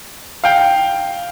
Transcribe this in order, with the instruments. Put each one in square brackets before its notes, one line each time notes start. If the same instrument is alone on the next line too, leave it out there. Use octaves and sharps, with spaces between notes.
[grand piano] F5 G5